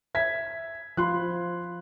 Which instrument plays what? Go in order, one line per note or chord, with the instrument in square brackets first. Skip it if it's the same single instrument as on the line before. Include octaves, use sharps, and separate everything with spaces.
[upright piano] E5 G#6 B6
[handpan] F3 F4 [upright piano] B5 C6 F#6